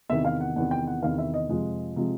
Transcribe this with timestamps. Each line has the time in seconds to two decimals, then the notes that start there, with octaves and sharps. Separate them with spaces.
0.09 E2 C3 D#3 E5
0.25 F5
0.41 F#5
0.56 E2 C3 D#3 F#5
0.71 G5
0.87 F#5
1.02 E2 C3 D#3 F5
1.18 E5
1.34 D#5
1.49 F2 C3 F3 G#3 D#5
1.96 C3 F3 G#3